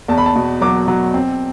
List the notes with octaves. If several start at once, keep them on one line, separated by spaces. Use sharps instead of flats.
E2 A5
B5
A5
B2
F#3 D6
F#3
C4